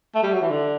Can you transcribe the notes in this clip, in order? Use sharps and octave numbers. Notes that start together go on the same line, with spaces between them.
A3
G3
F#3
E3
D3